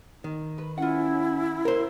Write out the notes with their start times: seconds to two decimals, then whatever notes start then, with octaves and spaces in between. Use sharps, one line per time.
0.24 D#3
0.58 B4
0.78 C#4 E4 F4 F#5
1.65 A#4 C5